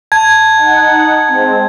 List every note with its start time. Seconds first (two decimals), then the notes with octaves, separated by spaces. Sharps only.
0.12 A5 G#6
0.56 D#4 F#5
1.28 G#3 C4